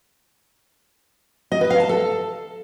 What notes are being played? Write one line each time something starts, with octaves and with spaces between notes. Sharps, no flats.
D#5
B4
F5
A5
A4